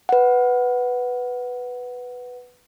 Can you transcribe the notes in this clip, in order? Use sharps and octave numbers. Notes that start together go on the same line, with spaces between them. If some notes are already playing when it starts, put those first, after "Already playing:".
B4 F#5